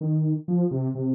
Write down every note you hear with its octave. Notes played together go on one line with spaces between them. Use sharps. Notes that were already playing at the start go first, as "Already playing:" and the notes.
D#3
F3
C3
C3